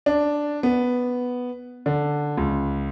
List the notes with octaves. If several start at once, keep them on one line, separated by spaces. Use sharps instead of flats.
D4
B3
D3
C#2